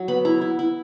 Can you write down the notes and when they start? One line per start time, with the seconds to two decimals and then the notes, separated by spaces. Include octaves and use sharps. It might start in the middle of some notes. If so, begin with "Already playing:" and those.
Already playing: F#3
0.08 B3 B5
0.25 E4 A#5
0.41 E4
0.59 E4